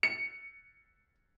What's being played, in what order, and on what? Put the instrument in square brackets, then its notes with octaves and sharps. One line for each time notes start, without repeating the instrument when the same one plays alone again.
[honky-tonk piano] C#7